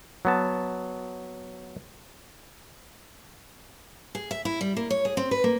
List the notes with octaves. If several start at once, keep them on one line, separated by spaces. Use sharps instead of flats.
F#3 B3 A5
G#4
E5
E4
G3
A#3
C#5
G#4
C4
B4
A#3